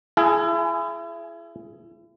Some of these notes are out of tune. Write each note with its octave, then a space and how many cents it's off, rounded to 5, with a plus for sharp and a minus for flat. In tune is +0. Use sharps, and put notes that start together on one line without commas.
E4 +35 G#4 +20 G#5 +0